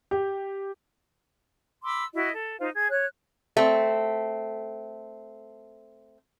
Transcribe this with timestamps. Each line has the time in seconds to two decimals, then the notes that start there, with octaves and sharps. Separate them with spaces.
0.11 G4
1.83 B5 C6 D6 E6
2.15 E4 F#4 D#5
2.33 A4
2.59 D#4 F4 C5 F5
2.74 G#4 G#6
2.89 C#5 F#6
3.57 A3 C4